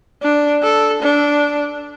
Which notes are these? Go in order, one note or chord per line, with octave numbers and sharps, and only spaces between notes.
D4
A4
D4